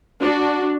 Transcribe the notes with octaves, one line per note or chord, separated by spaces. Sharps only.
D4 F#4